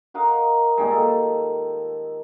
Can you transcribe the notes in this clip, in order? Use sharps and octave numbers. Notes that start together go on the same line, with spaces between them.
F#4 A#4 D#5 F5
A#2 D#3 G3 G#3
A4